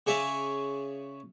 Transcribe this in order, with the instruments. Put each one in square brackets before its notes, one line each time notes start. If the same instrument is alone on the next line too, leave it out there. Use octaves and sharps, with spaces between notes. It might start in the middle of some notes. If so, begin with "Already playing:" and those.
[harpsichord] C#3 G#4 C#5 D5 E5